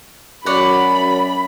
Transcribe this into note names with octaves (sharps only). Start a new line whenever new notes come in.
F#2 C#5 D5 F#5 B5